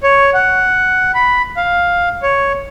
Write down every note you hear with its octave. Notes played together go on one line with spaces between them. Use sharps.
C#5
F#5
B5
F5
C#5